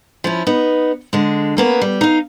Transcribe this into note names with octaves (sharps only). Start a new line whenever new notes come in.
F3 C#4 E4
B3 D#4
D3 G#3
G3 A#3 B3 C#4
G3
D#4 F5